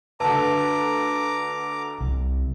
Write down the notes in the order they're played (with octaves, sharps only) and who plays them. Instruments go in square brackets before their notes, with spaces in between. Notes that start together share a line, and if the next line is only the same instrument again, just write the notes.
[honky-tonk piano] D2 D3 [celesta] B4 A5 [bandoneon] A#5 D6
[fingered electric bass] C2